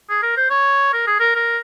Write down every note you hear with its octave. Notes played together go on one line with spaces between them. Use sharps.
G#4
A#4
C5
C#5
A#4
G#4
A#4
A#4